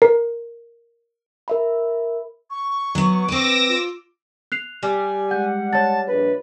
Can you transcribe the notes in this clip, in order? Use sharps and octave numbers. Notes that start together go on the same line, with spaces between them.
A#4
A#4 E5 B5
C#6
F#3 B3
C4 B4 D6 E6 A#6
F4
F#6 C7 F7
G3 G#5
G#3 F#5 G6
C#5 A5 A6
A#1 B4